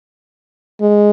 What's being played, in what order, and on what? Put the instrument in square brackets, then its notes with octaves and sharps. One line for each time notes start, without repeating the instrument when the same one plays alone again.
[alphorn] G#3